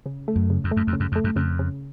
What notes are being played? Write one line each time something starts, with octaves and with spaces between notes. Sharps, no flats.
C#3
A3
F#2
C#3
F2
A3
F#2
F2
C#3
F#2
F2 A3
F#2
F2 C#3
C#3